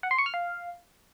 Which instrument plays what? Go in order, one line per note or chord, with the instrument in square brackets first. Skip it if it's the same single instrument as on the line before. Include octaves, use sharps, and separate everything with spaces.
[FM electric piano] F#5
C6
C#6
F6
F5